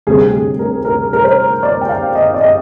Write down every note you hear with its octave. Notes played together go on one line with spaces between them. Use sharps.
D2 C3 G3 C4 G#4
G#4
A#4
A#4
A#4
C5
D5
G5
F5
D#5
D5
D#5